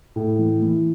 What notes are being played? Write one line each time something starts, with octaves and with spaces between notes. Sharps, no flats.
A2
E3
E3